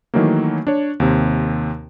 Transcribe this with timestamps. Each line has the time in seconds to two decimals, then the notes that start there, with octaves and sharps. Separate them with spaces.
0.14 D#3 E3 F#3 A3 A#3
0.67 D4 C#5
1.00 D#2 C3